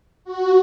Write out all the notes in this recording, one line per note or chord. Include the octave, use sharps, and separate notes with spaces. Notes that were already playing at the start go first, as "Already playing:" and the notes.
F#4